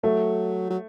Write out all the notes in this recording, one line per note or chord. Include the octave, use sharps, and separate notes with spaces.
F#3 A3
F#3